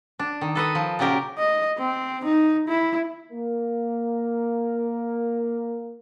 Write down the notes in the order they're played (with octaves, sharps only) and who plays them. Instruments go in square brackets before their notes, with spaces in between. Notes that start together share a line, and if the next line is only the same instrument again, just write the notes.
[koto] D4
D#3
A4 B4 D#5
F3
A#2 C#3 F#3 G4 A#4
[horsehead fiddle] D#5
C4
D#4
E4
[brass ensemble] A#3 A#4